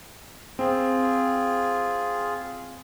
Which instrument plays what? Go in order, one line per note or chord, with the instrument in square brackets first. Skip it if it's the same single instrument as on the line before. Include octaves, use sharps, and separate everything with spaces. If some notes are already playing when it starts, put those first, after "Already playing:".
[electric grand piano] C4 [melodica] F4 G#4